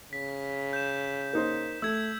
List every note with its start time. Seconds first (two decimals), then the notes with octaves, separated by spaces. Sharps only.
0.13 C#3 B6
0.73 G6 E7
1.33 A#3 D#4 C5
1.82 A3 E6 G#6